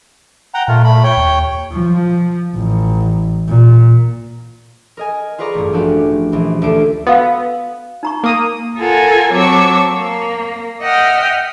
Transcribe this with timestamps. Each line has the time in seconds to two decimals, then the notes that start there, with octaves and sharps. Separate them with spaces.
0.54 F#5 G5 A#5
0.68 A#2 A3 F4 A#4
0.84 A3 B5
1.04 C#5 G5
1.17 D#2
1.73 F3
2.56 A1
3.49 A#2
4.97 A#4 D#5 G#5
5.38 F4 G#4 B4 D5 A#5 C#6
5.54 A1 G2
5.73 F3 A3 C#4 D4 F#4 G4
6.32 A#1 E3
6.62 D2 A3 D4 E4 D7
7.07 B3 F#4 F5 E6
8.03 D#4 A#5 C#6
8.23 A#3 D#6
8.78 F4 A4 A#4 F#5 G#5
9.34 F#3 C4 A5 C#6 D6 E6
9.91 A#3
10.81 D#5 E5 F#5 G5 D#6 F6